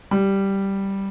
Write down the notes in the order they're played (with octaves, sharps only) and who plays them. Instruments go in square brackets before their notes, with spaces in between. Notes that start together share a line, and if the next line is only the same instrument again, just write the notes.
[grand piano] G3